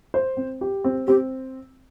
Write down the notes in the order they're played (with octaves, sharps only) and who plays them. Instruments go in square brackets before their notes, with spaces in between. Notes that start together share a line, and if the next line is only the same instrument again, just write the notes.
[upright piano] C5
C4
G4
C4
[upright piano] C4 [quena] G4